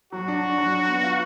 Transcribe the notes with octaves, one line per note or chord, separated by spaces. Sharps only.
F#3 F#4
D4
D4
F#3
D4
B3
F4